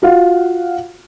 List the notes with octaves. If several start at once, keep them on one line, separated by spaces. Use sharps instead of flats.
F4 F#4 F5 F#5